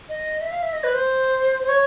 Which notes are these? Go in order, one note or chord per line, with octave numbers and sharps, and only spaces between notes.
D#5
E5
F5
E5
D#5
B4
C5
C5
C#5